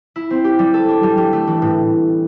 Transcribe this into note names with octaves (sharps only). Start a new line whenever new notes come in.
E4
C4
G4
G3
A4
D4
G3
G3
A3
E3
A2